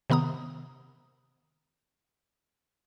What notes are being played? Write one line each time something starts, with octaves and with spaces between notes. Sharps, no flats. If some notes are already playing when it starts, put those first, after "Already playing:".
C3 D#3 B3 A#5 D#6